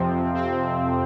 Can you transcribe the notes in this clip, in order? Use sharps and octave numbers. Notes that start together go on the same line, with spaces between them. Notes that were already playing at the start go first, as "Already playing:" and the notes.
Already playing: F2 C3 F3 C4
F2
C4